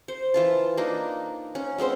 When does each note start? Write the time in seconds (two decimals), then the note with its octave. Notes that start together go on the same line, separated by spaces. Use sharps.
0.08 C5
0.34 E3 F4 A5
0.77 A#3 D4 D#4
1.55 C#4
1.78 G#3 B3 C4 C5